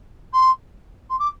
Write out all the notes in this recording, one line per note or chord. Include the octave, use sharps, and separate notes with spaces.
C6
C6
D6